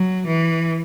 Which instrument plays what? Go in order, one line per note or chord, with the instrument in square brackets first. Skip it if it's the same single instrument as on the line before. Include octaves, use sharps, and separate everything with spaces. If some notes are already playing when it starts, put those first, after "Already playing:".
Already playing: [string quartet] F#3
E3